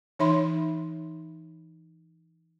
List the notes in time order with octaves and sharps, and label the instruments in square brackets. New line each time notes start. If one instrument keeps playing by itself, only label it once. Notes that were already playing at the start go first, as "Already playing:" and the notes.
[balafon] E3 D#4 C#5 E5 B5 C6